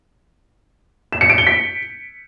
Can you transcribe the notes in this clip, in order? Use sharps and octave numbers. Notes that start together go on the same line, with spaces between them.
E7
C#7
D7
G7
B6